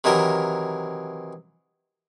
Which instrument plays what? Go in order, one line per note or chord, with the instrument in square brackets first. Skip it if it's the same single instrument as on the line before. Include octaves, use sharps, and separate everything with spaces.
[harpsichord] C3 D#3 E3 F#3 A#4